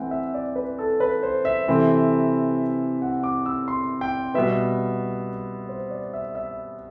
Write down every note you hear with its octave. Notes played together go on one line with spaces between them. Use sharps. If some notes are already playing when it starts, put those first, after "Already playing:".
Already playing: E3 A3 C4 F#5 G5
E5
D5
B4
A4
B4
C5
E5
C3 E3 A3 C4 E4
F#5
D6
E6
C6
G5
B2 G3 B3 E5
C5
D5
E5
E5